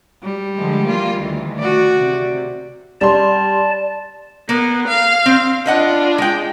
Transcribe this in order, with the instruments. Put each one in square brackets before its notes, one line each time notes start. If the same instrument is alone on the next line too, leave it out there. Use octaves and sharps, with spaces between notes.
[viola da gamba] G3
[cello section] D3 F3 G#3
E3 A#3 F4
D2 D#3 E3
[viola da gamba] F#4 D5
[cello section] C3
[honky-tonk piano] G3 C6 [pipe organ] D5 A5
[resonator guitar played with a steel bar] A#3 [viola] B3
[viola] F5
[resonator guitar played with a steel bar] C4
[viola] D4 F4 [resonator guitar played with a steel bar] B4 D#5 F#5
[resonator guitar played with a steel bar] G#3 G5